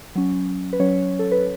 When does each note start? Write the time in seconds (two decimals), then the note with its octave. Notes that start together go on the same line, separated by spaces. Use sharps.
0.15 F#3 C#4
0.73 B4
0.80 F#3 C#4 C#5
1.19 A4
1.32 B4